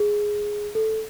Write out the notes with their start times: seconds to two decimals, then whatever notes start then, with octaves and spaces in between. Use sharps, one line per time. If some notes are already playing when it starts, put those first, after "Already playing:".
Already playing: G#4
0.75 A4